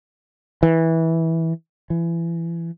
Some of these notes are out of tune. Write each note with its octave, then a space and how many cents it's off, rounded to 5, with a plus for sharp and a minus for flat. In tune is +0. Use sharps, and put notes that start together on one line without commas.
E3 -15
E3 +25